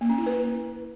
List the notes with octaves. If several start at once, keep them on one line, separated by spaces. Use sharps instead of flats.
A#3
C#4
E4
B4